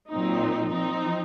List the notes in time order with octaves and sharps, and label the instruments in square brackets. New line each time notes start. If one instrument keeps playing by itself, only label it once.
[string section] A#2 F#3 C4 D#4
F3 C4 D#4